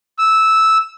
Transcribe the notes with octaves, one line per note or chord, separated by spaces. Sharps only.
E6